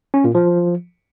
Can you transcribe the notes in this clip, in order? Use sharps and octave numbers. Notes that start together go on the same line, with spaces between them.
C#4
A#2
F3